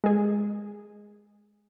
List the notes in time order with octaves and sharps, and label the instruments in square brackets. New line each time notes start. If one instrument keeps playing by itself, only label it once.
[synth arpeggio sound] G#3 G#4